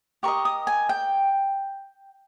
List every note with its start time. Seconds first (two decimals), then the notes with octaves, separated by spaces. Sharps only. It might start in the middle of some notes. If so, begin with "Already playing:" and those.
0.23 G4 A#4 D#5 C#6
0.45 D#6
0.67 G#5
0.89 G5